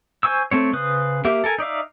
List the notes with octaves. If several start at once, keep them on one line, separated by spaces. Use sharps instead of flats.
C5 G#5 C#6 E6
A3 C4 C#5
C#3 B4 C5 D#6 F#6
A#3 G4 A#4 E5 D6
A4 A#4 G#5
D#4 D5 E5 F5